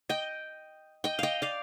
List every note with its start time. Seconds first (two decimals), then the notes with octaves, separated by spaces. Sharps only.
0.09 D#5 G5
1.04 D#5 G5
1.19 D#5 F5 G5
1.42 D5 F5